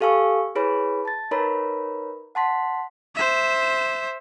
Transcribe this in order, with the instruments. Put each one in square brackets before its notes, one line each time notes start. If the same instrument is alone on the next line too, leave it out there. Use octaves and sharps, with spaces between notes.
[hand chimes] G4 A4 F5 G#5 C#6 E6
E4 G#4 B4 C#5 B5
A5 A6
D#4 A#4 B4 C#5 A#5 B5
F#5 A5 C6 B6
[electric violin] C5 E5